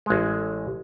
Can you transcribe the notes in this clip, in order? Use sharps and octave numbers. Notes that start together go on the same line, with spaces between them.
A1 G#3